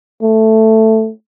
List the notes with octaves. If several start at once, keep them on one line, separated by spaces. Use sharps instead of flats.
A3